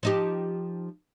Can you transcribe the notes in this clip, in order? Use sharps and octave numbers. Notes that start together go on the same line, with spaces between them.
F3 D#4 G4